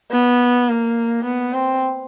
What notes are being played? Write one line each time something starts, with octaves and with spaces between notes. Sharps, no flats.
B3
A#3
B3
C4